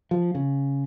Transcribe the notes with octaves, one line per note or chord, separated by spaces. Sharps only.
F3
C#3